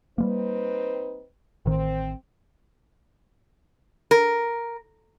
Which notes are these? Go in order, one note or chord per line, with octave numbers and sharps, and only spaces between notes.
G3 G#3 A#3 C4 D#4 B4
A1 D#3 C4
A#4